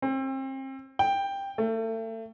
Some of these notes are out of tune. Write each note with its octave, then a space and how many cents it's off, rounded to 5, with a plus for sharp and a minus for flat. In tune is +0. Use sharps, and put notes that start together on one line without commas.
C4 +35
G5 +10
A3 +35